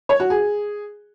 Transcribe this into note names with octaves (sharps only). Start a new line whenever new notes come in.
C#5
F#4
G#4